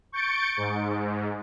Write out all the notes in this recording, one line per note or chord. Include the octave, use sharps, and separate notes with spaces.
C#6 G6 A6 C#7 D7
G#2